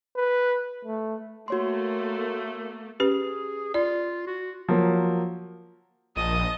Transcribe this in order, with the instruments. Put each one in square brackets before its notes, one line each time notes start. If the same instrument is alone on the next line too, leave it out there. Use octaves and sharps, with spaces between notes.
[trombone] B4
A3
[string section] A3 A#3 [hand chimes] F#4 C#5 C6
[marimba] C#4 G4 B4 [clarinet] G#4
[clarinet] F4 [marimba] D5
[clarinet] F#4
[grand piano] F3 F#3 A#3
[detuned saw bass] A#1 [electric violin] D#5 A5 [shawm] D#6